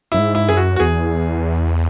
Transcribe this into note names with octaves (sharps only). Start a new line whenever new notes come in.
F#2 E4
G#2
E4
F#2 G#4
F#4
F#4
E2 G#4